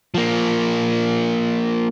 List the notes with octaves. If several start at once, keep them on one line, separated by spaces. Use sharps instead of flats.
F3 A#3